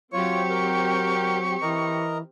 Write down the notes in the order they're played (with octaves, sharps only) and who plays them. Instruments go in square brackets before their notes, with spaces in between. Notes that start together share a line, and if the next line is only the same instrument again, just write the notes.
[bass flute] F#3 [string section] C4 G4 [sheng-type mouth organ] F4 C#5 [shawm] C#6
[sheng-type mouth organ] A#4 G5
[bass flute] E3 [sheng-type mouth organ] A#4 D#5 A#5